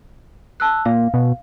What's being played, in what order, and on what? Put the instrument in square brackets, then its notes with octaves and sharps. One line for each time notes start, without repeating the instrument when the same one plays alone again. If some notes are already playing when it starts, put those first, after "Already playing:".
[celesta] A5 E6 F#6
[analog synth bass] A#2 [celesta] F5
[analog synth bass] B2